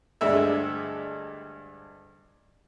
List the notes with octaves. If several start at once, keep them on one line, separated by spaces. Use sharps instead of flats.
D2 G2 G#3 D4 A4 E5